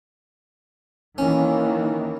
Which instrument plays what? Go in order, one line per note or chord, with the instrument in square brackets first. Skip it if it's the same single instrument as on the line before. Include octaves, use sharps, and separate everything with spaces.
[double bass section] D#3 E3 A#3 [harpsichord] C#4